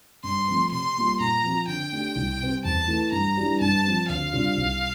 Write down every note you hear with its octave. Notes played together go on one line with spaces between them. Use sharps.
G2 C6
F3 A3 C4
C3 C6
G3 A#3 F4
A#2 A#5
F3 C4 F4
D3 G5
A3 D4 G4
C2
C3 G3 C4
E2 A5
E3 A3
G2 A#5
E3 G3 D4 G4
G2 A5
F3 C4
D2 F5
C3 G3 D4 F4
C2